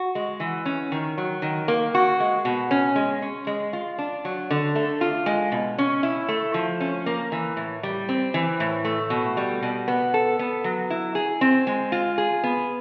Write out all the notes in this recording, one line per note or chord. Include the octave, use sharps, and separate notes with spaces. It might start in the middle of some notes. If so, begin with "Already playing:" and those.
Already playing: F#4
G#3
E3
C#4
D#3
F#3
D#3
A#3
F#4
G#3
B2
C#4
G#3
C#4
G#3
F4
D4
F#3
D3
A3
F4
G#3
B2
C#4
E4
A3
F3
C#4
A#3
E3
A2
G3
C4
E3
A2
A3
B2
G3
B2
B3
A4
B3
F#3
E4
G#4
C4
G#3
F4
G#4
B3